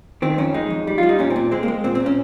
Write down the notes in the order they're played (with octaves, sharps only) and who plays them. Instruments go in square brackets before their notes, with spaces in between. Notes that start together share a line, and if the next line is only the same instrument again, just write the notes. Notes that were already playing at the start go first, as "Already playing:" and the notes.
[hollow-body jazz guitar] D#3 C4
F2 C#4
G#3 D#4
F2
G3
G3 F4
D#4
A#2 C#4
C4
A#2
G#3 C4
A#3
G#3
A#2 C4
C4
A#2
C#4